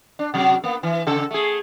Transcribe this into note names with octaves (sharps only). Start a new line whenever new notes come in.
D4
C3 F#3
A#3 B3
E3
C#3 A4
A3 G#4